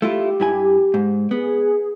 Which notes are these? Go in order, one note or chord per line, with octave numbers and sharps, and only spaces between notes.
A3 E4 F4 G4
G2 E4 G#5
G#2
B3 G#4